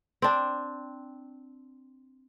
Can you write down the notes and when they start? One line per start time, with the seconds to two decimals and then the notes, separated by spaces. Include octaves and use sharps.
0.22 C4 D4